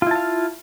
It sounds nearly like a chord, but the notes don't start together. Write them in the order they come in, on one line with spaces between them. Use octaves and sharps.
F4 E4 A5 F5